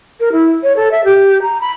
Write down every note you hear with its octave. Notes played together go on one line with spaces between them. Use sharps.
A#4
E4
C#5
A4
E5
G4
A#5
B5